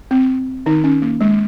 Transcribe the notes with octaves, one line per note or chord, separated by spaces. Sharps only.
C4
D#3 D#4
C#4
A#3
G#3